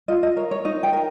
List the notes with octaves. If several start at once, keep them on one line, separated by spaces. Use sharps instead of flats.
F4 D#5
D#5
A#4 C#5
C#5
D#4 D#5
G5
A#4